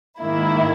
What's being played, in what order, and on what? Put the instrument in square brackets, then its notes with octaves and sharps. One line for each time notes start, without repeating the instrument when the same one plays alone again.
[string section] G#2 D#3 A#3 E4